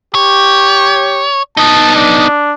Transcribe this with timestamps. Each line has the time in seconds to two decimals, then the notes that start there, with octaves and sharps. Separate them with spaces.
0.15 G4 C#5
1.57 B3 D#4 A5
1.95 D4